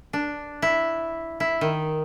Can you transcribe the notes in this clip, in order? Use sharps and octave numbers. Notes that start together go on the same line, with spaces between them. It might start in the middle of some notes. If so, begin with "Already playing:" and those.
D4
E4
E4
D#3